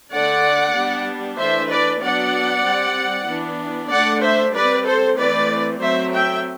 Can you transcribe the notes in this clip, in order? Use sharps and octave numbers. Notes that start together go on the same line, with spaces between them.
D3 A3 D4 D5 F#5
G3 B3 D4
E3 A3 D4 C5 E5
B4 D5
F#3 B3 D4 D5 F#5
G3 C4
E3 B3 D4
D3 A3 D4 D5 F#5
C5 E5
G3 C4 B4 D5
A4 C5
E3 A3 C4 B4 D5
F#3 A3 C4 C5 E5
E5 G5